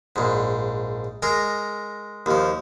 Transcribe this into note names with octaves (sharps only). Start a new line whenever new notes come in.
A#1 G#2
G#3 A#4 A#5
D#2 F3